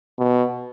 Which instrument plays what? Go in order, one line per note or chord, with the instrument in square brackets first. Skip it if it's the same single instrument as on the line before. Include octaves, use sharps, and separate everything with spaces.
[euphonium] B2